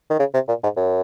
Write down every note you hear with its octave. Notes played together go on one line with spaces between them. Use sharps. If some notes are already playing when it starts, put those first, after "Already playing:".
D#3
C#3
C3
A#2
G#2
F#2